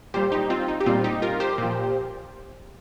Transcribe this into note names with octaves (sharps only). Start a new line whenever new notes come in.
A#2 G3 G4 C5
D#4 G4
C4 F4
D#4
G4
A#2 G3 C4 F4
D#4 G4
F4 A#4
G4 C5
A#2 F3